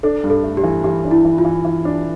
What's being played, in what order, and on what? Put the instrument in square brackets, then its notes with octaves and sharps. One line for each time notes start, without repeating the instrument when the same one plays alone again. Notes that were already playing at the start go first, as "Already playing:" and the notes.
[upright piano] D4 [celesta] A4
[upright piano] G2
[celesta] A4
[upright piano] A3
[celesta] G4
[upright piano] E3
[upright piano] E3 [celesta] G4
[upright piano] D4
[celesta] E4
[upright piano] E3
[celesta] F4
[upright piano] E3
E3
D4